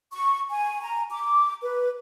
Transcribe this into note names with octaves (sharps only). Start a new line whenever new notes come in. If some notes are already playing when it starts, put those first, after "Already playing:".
C#6
G#5
A#5
D6
B4